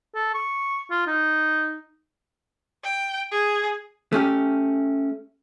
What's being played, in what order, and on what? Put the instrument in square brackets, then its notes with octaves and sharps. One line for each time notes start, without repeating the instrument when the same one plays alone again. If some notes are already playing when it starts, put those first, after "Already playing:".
[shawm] A4
C#6
F4
D#4
[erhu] G5
G#4
[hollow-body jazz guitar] A3 C#4 G4